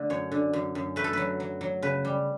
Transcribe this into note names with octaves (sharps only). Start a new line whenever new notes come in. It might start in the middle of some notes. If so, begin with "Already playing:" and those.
Already playing: D3 A3
F#2 C#5
D3
F#2
F#2
A3 B4
A4
F#3 B4
F#3
F#3
C#3 B4
G3